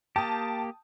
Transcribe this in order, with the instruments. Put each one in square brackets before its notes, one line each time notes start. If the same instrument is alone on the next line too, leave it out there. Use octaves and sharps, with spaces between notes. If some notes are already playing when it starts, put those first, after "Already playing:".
[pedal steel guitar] A#3 G4 [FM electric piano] G5 D#6 [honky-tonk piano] A5